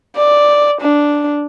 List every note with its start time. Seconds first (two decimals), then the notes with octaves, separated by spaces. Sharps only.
0.16 D5
0.81 D4